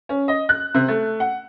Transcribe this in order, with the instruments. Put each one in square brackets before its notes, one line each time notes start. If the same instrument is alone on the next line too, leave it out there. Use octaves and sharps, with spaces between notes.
[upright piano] C#4
D#5
F#6
C3
A3
F#5